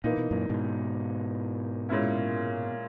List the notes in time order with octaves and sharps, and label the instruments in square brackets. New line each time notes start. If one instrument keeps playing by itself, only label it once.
[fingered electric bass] A#2 [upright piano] E3 A#3 D#4
[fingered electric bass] B2
F#2 A#2
G#2 B2
[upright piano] A#2 G#3 C#4 E4